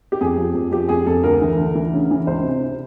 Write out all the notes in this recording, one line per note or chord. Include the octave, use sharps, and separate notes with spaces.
G4
F2 G#4
F3
F2
F3 G4
F2 G#4
F2 A4
D2 A#4
E3
D2
E3
C#3
E3
C#2 C5
C3